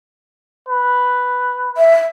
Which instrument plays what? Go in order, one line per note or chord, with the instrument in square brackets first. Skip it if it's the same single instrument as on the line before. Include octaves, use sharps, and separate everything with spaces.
[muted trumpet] B4
[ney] E5